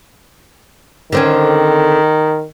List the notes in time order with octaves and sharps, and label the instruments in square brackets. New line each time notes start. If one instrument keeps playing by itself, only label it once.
[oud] D3 C4 C#4 [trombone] D#3